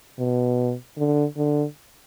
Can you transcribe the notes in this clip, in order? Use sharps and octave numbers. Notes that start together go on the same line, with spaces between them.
B2
D3
D3